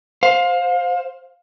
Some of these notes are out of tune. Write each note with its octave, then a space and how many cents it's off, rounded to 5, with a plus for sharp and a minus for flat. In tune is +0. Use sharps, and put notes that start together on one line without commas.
C5 +0 F5 +25